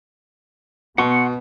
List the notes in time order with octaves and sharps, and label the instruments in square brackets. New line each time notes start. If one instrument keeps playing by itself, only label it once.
[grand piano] B2 [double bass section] B3 [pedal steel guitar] F#5 C6 C#6